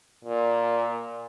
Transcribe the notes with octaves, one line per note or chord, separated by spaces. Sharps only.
A#2